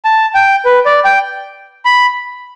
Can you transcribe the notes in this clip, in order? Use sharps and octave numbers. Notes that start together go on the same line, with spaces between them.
A5
G5
B4
D5
G5
B5